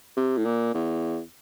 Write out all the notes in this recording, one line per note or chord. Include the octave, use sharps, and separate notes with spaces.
C3
A2
A#2
E2